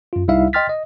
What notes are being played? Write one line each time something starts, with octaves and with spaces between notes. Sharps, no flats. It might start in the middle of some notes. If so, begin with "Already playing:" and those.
F#2 F4
C2 G3 D#4 E4 E5 F5
D#5 G5 C6 F6 A6 B6
D#5